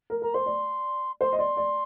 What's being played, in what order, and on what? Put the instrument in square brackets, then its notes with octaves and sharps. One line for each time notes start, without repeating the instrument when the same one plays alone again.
[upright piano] A#4
[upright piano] A#4 [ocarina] A#5
[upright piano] C5 [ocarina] C6
[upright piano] D5
[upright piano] C5 [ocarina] C6
[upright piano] D#5
[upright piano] D5 [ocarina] C6
[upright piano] D5